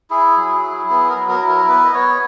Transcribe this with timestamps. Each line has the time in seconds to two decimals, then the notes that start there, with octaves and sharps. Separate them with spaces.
0.10 E4 G#4
0.37 F#3
0.63 E4
0.90 B3 G#4
1.09 A#4
1.16 F#3
1.28 A#4
1.42 E4
1.48 A#4
1.68 B3 B4
1.85 D#5
1.94 B3 C#5